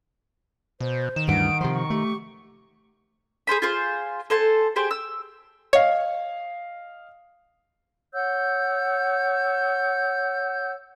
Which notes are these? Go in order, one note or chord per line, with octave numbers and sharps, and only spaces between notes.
B2 C5
D#3 E7
D2 G2 E3 F#5 D7
C3 F3 C6
C#6
A3 G4
G#4 A4 C5 B5
F4 G#4 C5
A4 C5 G#5 A5
G4 G#4 C5 G5
E6
C#5 D#5 F5
C#5 F#5 E6 G6